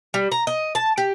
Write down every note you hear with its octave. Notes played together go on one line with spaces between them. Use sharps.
G3
A#5
D#5
A5
G4